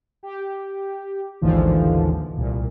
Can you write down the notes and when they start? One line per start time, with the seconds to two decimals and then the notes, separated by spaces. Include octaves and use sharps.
0.23 G4
1.41 A1 D#2 G#2 D3 E3 F3
2.37 C2 A#2